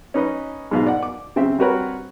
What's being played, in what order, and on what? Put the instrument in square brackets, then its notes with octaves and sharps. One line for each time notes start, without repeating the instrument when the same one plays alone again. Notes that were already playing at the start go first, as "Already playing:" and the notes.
[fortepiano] C#4 D#4 B4 D#5
G#2 B2 F5
D5 F#5
D6
C#3 C4 E5
G3 C4 F#4 A#4 B4 C#5